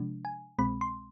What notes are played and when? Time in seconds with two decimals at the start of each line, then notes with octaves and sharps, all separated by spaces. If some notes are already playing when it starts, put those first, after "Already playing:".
Already playing: C3 F3 G#3 D4
0.25 G#5
0.59 C2 B2 G#3 C4 B5
0.81 C6